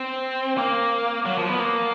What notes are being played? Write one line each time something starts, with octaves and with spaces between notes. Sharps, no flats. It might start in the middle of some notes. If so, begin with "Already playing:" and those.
Already playing: C4
A#3
F#3
F3
B3
A#3